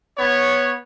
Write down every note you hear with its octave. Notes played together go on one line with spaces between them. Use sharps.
B3 C#5